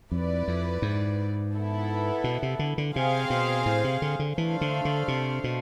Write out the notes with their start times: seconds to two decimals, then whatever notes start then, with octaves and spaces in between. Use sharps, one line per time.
0.11 F2 E4 B4 D5
0.48 F2
0.82 G#2
1.54 B3 E4 A4
2.24 B2
2.42 C3
2.59 D3
2.78 D3
2.95 C3 C4 G#4 C5 F5
3.30 B2
3.66 A2
3.84 C3
4.02 D3
4.19 D3
4.37 E3 A3 D4 A4 C5 F5
4.61 D3
4.85 D3
5.08 C3
5.44 B2